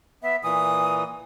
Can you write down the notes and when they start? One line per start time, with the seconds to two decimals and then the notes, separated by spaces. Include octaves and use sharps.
0.23 B3 E5
0.43 A#2 E3 D#6